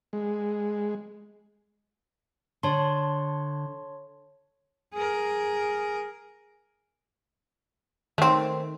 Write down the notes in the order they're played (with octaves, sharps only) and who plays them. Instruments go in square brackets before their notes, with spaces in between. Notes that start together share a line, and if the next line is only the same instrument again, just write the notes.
[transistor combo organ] G#3
[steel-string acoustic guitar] D3 [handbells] C#5 A5 C6
[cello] G#4 A#4
[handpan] D#3 [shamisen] A3 C4